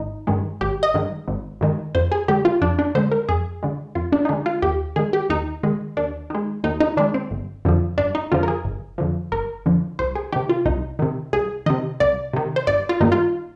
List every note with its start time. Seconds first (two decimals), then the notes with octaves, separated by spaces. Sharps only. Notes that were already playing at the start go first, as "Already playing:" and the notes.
Already playing: G#1 D#4
0.27 G2 D#3 G#3
0.61 G#1 G4
0.83 D#5
0.94 G2 D#3 G#3
1.28 G#1
1.61 G2 D#3 G#3
1.95 F2 C5
2.12 G#4
2.28 D3 G#3 G4
2.45 F4
2.61 F2 D4
2.79 D4
2.95 D3 G#3 C5
3.12 A#4
3.29 F2 G#4
3.63 D3 G#3
3.95 F2 F4
4.12 D4
4.25 D#4
4.29 D3 G#3 D4
4.46 F4
4.62 D#2 G4
4.96 D#3 G#3 G#4
5.13 G4
5.30 D#2 D#4
5.63 D#3 G#3
5.97 D#2 D4
6.30 D#3 G#3
6.64 D#2 D#4
6.80 D#4
6.97 D#3 G#3 D4
7.14 C4
7.31 G1
7.65 F2 D3 F3
7.98 G1 D4
8.15 D#4
8.32 F2 D3 F3 F4
8.43 A#4
8.48 G#4
8.65 G1
8.98 F2 D3 F3
9.32 G1 A#4
9.66 F2 D3 F3
9.99 C2 C5
10.15 G#4
10.32 C3 D#3 G4
10.49 F4
10.66 C2 D#4
10.99 C3 D#3
11.33 C2 G#4
11.66 C3 D#3 D#5
12.00 C2 D5
12.33 C3 D#3
12.56 C5
12.67 G1 D5
12.89 F4
13.00 G2 D#3 G3 A#3 D#4
13.12 F4